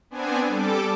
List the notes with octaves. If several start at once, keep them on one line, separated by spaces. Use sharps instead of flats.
B3 C4 D4 G#5
G3 A4 D6